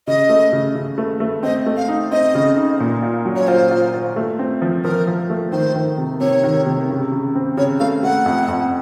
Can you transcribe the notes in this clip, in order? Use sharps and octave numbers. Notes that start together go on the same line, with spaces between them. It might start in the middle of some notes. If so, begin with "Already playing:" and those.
C#3 D#5
A3
C#3
C#3
A3
A3
C4 D#5
A3
F5
D#4
C4 D#5
C#3
D#4
A#2
F4
F#3
C#5
F4 C5
F4
F4
A3
C4
F3
F3 A#4
F3
A3
D#3 C5
D#3
C3
C3 C#5
D#3
C3
C#3
C#3
C4
C#3 C#5
A3 F5
A3 F#5
F2
F2